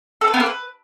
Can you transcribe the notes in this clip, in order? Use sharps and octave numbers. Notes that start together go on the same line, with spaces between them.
A4
B4
B3
A#3
B4